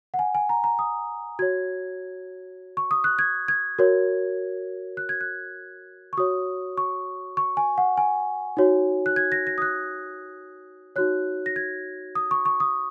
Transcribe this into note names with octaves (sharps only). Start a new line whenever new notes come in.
F#5
G#5
G#5
A#5
A#5
D#6
F#4 C#5 G#6
C#6
D#6
F#6
G#6
G#6
F#4 A#4 C#5
F#6
G#6
F#6
C#6
F#4 C#5 D#6
C#6
C#6
G#5
F#5
G#5
D#4 F#4 C#5
F#6
G#6
A#6
A#6
D#6
F#6
D#4 F#4 C#5 F#6
A#6
G#6
D#6
C#6
C#6
D#6